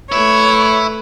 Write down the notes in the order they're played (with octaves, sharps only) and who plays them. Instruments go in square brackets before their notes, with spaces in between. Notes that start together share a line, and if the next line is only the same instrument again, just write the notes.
[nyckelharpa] A3 B4 [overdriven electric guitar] E4 [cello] C#5